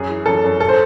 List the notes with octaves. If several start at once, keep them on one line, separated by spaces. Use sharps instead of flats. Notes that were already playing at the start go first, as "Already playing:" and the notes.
Already playing: F#2 G#4
E3
F#2 A4
F#2
A4
C5